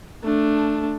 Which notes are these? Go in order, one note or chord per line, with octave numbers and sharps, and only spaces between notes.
A3 D4